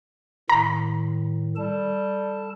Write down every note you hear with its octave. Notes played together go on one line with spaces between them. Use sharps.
A2 D#3 A#5
G3 A4 A5